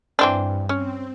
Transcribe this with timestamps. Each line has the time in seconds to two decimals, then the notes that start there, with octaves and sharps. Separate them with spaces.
0.19 G2 E3 C4 D4
0.69 C4 C#4